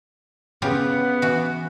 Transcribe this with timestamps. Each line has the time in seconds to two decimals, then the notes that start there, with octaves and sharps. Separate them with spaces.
0.62 C#3 B3 F4 G4
1.22 E3 F#4